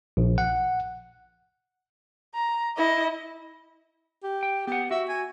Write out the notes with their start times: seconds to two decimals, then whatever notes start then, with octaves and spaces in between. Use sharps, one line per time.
0.17 A#1
0.38 F#5
2.34 A#5
2.77 E4 D#5
4.23 G4
4.43 G5
4.67 B3 G4 F#5
4.91 F#4 E5
5.09 G#5